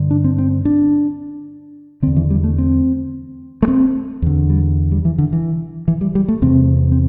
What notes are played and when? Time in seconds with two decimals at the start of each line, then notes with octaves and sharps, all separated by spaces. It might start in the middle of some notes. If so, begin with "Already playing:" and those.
Already playing: G2 D3
0.11 D4
0.24 C4
0.38 C4
0.65 D4
2.02 D3 C4
2.07 E2
2.16 E3
2.30 G3
2.44 A3
2.58 C4
3.62 A3
3.68 C4
4.22 E2 D3
4.50 G3
4.92 G3
5.05 E3
5.18 D3
5.33 E3
5.88 E3
6.01 G3
6.15 G3
6.28 A3
6.42 E2 C3 C4
6.92 C4